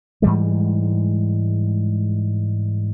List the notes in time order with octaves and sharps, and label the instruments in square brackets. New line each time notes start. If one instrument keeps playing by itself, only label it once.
[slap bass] G#2 E3 G3 G#3